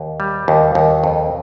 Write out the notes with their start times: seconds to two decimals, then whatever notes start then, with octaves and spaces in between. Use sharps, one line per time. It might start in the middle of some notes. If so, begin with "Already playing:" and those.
Already playing: D#2
0.20 G3
0.48 D#2
0.75 D#2
1.04 F2